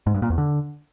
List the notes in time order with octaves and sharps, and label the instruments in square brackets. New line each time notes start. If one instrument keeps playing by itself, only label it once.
[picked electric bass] G#2
G2
A#2
E2
D3